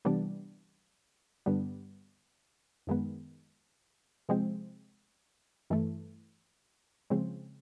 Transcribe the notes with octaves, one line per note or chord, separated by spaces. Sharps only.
C3 E3 G3 B3 D4
G2 D3 G3 B3 D4
F#2 D#3 G#3 B3
C3 F3 G#3 C4
G2 E3 A3
C#3 F3 G#3 C4